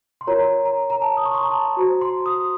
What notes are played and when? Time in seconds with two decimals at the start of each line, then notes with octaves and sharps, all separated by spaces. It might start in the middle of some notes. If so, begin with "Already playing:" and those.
0.21 C6
0.27 F4 A#4 C#5 A#5
0.65 A#5
0.90 A#5
1.02 A5
1.17 D#6
1.26 C#6
1.34 C6
1.43 A#5
1.51 A5
1.76 F#4 C5 A#5
2.01 C6
2.26 D#6